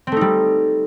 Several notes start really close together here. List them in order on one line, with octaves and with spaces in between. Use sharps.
C4 A3 D#4 G3